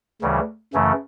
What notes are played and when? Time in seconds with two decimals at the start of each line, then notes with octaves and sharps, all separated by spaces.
0.22 D2 C#3 E3 G3
0.74 F#2 C#3 E3 A3 C#4